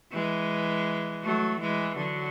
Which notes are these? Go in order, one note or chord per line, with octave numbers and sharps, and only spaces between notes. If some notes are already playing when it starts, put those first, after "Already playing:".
E3 G#3
F#3 A3
E3 G#3
D3 F#3